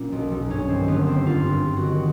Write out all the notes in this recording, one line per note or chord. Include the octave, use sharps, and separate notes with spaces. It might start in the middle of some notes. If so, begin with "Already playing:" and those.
Already playing: A#2 F#3 C#4
B1
B1
G2 C#4
D#3 C4
G1 B3
G1 C4
G2 F4
G2
G1
F#4
D#3